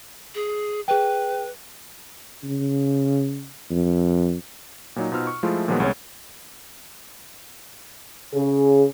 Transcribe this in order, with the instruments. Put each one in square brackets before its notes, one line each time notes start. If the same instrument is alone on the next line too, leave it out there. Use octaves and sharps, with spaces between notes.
[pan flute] G#4
[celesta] G#4 G5 [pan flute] B4
[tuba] C#3
F2
[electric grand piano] A#2 F#3 D#4
B2 D#4 F4 C5 E6 F6
C#6
F3 G#3 A3 E4 F4
A#2 D#3 F3 F#3 G#3 B3
C2 G#3 B3 C#4 C#5
[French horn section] C#3 G#4